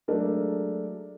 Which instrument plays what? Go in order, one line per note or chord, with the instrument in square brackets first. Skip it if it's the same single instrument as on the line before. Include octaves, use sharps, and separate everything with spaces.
[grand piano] F#3 G#3 A3 D4 A#4